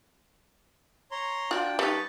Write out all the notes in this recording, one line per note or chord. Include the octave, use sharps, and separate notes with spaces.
C#5 A#5 C6
D4 F4 F#4 G5
G3 D#4 B4 A5 C#6